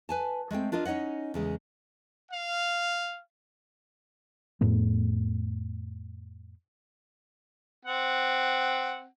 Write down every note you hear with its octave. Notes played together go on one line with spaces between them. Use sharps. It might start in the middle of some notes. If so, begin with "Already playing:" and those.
B4 G#5 A5
G#3 A3 C4 G5
D4 F4 A#4 D#5
C#4 D#4 C#5 D#5 F#5
E2 C#3 G#3
F5
F2 A2 A3 B3
C4 F#5